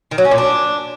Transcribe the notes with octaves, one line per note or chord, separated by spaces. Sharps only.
D#3
F#3
C#4
A#2
D4